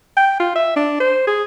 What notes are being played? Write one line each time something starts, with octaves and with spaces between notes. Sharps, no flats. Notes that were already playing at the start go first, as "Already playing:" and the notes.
G5
F4
E5
D4
C5
G#4